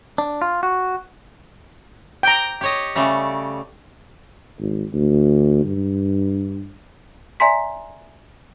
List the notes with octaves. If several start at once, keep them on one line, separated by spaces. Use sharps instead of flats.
D4
F4
F#4
G5 A#5
G4 C#5 D#5
C#3 G3 A3
G#1
D2
G2
D5 E5 G#5 A#5 C6 B6